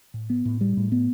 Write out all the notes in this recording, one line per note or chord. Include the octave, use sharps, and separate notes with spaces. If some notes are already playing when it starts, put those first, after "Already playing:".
A2
B3
A2
G3
A2
B3